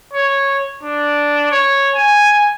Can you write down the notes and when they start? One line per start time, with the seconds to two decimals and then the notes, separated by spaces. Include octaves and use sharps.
0.13 C#5
0.83 D4
1.51 C#5
1.95 G#5